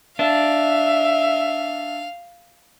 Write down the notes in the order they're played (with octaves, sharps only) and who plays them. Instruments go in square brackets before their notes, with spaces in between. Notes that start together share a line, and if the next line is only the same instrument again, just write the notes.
[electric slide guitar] D4 [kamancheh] E5 [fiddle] F5